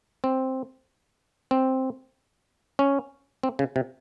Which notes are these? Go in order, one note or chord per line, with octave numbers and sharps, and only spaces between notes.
C4
C4
C#4
C4
C#3
C3